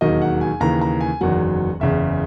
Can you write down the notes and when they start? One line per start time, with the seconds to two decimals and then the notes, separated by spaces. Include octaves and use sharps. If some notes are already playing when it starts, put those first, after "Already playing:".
0.01 E1 D#2 D#3 F#3 D#5
0.22 F#5
0.41 G#5
0.60 D#2 C#3 E3 A#5
0.81 A#5
1.01 G#5
1.21 F#1 E2 D#3 F#3 F#5
1.80 F#1 E2 C#3 E5